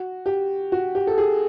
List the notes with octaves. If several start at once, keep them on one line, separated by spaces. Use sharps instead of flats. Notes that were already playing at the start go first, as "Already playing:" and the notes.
Already playing: F#4
G4
F#4
G4
A4
G#4